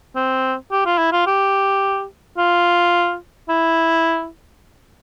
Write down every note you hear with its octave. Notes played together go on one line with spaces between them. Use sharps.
C4
G4
F4
E4
F4
G4
F4
E4